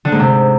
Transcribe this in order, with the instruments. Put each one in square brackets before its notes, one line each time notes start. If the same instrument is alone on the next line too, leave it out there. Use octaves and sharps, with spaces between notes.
[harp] D3
G#2
C3